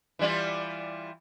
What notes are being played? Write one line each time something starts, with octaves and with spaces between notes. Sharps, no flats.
E3 G3 F4